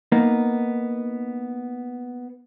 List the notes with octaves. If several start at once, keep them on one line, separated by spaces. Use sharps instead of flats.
A#3 B3 D#4